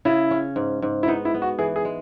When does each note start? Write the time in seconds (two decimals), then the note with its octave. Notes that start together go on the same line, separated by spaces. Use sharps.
0.05 C#3 E4
0.31 C#4
0.56 G#2
0.82 G#2
1.03 E4
1.08 B3 D#4
1.25 E4
1.34 B3
1.42 F#4
1.59 E3 G#4
1.76 G#4
1.85 G#3